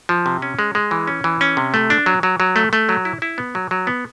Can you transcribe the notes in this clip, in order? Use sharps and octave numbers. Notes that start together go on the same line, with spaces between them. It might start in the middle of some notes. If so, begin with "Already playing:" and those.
F3
C3
C#4
G#3
G#3
E3
C#4
E3
C#4
C3
A3
D4
F#3
F#3
F#3
A3
A3
F#3
E4
E4
B3
F#3
F#3
B3